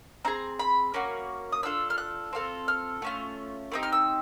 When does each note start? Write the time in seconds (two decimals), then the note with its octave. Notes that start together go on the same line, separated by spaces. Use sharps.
0.25 C4 D#4 G#4 A#5
0.59 B5
0.94 A#3 C#4 F#4
1.52 D#6
1.63 D4 F4 A4 E6
1.90 F6
1.98 F#6
2.33 C4 F4 A4
2.68 F6
3.02 A3 C#4 F4
3.72 A3 C4 D#4 G4
3.83 F6
3.92 E6